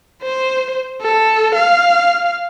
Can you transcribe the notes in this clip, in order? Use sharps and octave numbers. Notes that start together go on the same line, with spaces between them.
C5
A4
F5